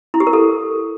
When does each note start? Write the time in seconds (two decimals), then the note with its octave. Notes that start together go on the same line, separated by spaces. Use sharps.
0.14 E4
0.20 G4
0.27 A#4
0.33 A4